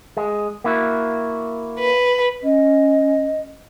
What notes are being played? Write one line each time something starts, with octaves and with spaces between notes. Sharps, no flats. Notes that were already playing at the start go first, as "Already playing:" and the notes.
G#3
A#3 E4 F#4
B4
C#4 D#5